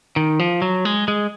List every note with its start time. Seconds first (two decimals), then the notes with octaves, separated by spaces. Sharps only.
0.16 D#3
0.39 F3
0.62 F#3
0.85 G#3
1.08 G#3